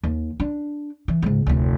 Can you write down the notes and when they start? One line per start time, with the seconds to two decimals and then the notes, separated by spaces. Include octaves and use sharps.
0.03 D#2
0.40 D4
1.08 E3
1.22 C#2 G#2
1.46 F1 D2